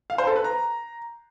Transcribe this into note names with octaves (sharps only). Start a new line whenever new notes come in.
F5
C5
A4
B4
A#5